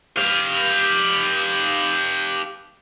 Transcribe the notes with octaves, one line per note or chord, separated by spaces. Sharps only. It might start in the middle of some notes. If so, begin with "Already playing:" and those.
G4 F5